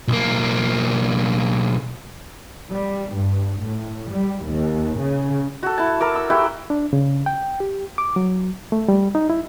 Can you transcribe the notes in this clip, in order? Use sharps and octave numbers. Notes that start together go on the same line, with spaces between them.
B1 A#3
G3
G2
A2
G3
D#2
C#3
F#4 A4
E4 A5
A4 A#4 D6
E6
E4 F#4 G4
D4
C#3
G5
G4
D6
F#3
A3
G3
D#4
E4